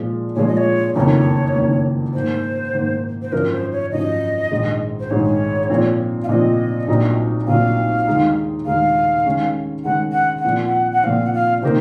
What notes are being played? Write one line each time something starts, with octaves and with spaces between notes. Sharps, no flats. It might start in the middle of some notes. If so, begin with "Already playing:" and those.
Already playing: A#2 F3 G#3
A#2 F3 G#3 C#5
D#5
C#5
F#1 F2 D#3 A#3 C#5
F#1 F2 D#3 A#3
G#2 D#3 A#3 C5
G#2 D#3 A#3
C5
G#1 F#2 F3 A#4
C5
C#5
G#1 F#2 F3 D#5
A#1 G#2 D#3 G#3
C5
A#1 G#2 D#3 G#3 C#5
A#2 F3 C4
F5
A#2 F3 C4 D#5
A#1 A#2 F#3 C4 D#4
A#1 A#2 F#3 C4 D#4 F5
D#2 D#3 G#3 D#4
D#2 D#3 G#3 D#4 F5
D#3 G#3 C#4
D#3 G#3 C#4 F#5
F#5
F#5
A#2 F3 C4
F#5
F#5
A#2 F3 C4 F5
F#5
F5
C3 D#3 A#3 D#4 A#4 C5